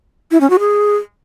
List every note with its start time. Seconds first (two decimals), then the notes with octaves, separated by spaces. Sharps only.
0.31 E4
0.41 C#4
0.50 F#4
0.59 G#4